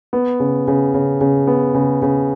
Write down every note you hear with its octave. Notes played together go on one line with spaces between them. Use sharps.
B3
C#3
C#3
C#3
C#3
B3
C#3
C#3